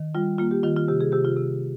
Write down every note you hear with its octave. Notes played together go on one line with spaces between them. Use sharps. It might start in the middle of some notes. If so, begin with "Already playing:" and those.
Already playing: D#3
G3 F4
A#3 F4
G4
D#3 F4
F4
C3 G4
G#4
C3 G4
F4
C3